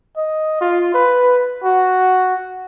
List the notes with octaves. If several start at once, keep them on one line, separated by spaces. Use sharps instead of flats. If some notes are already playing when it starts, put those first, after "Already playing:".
D#5
F4
B4
F#4